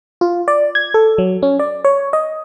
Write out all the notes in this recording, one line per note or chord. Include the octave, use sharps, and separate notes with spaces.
F4
D5
G#6
A4
F#3
C#4
D5
C#5
D#5